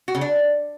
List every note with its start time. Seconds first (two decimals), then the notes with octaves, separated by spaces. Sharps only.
0.08 F#4
0.15 C#3
0.21 D4